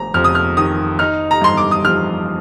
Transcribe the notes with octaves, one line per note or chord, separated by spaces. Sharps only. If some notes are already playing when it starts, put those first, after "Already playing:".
Already playing: F1 A#5
F2 F6
D#6
F6
D#3 D#6
D#4 F6
A#5
G2 C6
D6
D#6
F3 F6